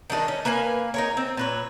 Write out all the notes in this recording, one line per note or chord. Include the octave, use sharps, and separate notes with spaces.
D#3 G3 D4 D#4
C#4
A#3 B4 F5 G#5
D#4 A#4 C#5
C4
A#2 B4 C#5